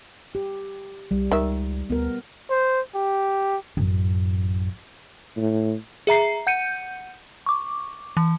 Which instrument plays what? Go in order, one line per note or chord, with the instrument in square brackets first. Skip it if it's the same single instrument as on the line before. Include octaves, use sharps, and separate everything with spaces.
[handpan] G4
[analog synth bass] C2 [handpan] G3
[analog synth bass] C#2 [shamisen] D#3 E5
[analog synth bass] D2 [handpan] B3 A#4
[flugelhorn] C5
G4
[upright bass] A1 F#2
[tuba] A2
[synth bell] G#4 E5 A#5 C7
F#5 G6 C#7 D#7
C#6 D6
E3